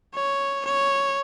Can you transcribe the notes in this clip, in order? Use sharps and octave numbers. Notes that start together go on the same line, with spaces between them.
C#5
C#5